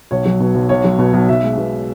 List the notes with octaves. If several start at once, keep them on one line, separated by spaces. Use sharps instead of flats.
B1 C#5
F#3
B2
B1
B1 C#5
F#3
B2
B1
B1 E5
G#3
B2